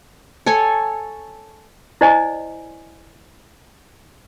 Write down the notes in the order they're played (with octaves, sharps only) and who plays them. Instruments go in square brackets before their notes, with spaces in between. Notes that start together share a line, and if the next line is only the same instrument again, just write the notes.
[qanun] A4 C#5 G#5
[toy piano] E4 C5 D5 D#5 G#5